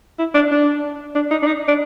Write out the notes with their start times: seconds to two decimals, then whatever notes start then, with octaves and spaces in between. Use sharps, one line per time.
0.19 E4
0.34 D4
0.51 D4
1.15 D4
1.31 D#4
1.42 D4
1.47 D#4
1.68 D4